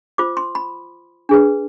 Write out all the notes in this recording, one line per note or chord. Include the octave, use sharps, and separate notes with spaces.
F4 C5 D6
C6
B5
D4 G#4 B4